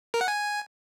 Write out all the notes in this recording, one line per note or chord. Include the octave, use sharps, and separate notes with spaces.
A#4
F#5
G#5